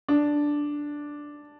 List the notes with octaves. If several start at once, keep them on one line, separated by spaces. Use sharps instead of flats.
D4